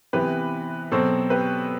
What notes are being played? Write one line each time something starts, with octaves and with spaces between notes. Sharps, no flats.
C3 E3 B3 G4 B4
B2 F#3 C4 A4 C5
G4 B4